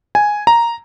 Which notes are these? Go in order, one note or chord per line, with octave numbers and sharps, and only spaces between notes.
G#5
A#5